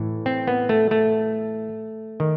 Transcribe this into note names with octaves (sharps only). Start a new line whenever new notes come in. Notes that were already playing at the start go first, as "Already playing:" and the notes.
Already playing: A2 E3
C4
B3
A3
A3
D#3